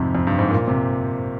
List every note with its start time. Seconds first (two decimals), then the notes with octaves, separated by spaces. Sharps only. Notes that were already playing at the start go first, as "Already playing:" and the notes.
Already playing: F2 G#2 C3
0.15 F2
0.27 G2
0.39 G#2
0.51 A#2
0.68 C3